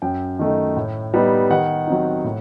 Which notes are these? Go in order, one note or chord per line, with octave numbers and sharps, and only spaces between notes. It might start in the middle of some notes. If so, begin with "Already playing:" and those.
F#2 G5
D#3 A3 D#4
A2
G3 B3 D#4
D#3 F#5
F#3 C4 D#4
A2